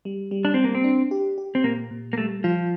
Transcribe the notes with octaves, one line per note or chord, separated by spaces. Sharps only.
G3
G3
D4
G3 C4
A#3
C4
D4
G4
G4
C4
A#2 A#3
A#2
A#3
G3 A3
F3 F4